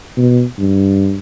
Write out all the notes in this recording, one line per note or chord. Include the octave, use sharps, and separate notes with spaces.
B2
G2